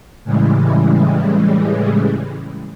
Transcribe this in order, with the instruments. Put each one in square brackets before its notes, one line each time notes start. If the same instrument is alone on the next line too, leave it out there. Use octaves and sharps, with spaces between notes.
[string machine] A2 C#3 E3 G3 G#3